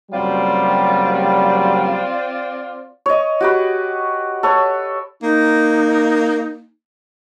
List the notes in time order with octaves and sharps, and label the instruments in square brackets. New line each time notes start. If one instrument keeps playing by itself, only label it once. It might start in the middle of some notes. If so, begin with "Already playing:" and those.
[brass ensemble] F#1 F#3 G3 [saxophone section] C4 F4 D5
[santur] C#5 D#5
F#4 G4 B4
A4 B4 C#5
[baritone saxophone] A#3 [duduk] D#4